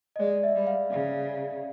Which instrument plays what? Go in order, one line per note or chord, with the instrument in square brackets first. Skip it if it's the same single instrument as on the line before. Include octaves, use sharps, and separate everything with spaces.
[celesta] D#5
[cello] G#3 [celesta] D5
[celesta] E5
[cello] G3
[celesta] F5
[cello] C#3